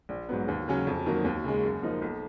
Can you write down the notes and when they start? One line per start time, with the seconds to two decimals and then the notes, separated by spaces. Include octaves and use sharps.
0.09 A#1
0.29 G#2 F#3 B3
0.48 D#2
0.68 C#3 F#3 C#4
0.87 F2
1.06 D#3 F#3 A#3
1.25 D#2
1.44 C#3 G#3
1.63 F#2
1.83 F3 A#3 D#4
2.02 B1